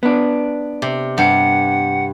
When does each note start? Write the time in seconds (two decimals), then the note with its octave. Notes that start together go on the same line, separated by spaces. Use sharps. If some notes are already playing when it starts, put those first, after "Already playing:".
0.03 B3 D4
0.82 C3
1.18 G2 F#5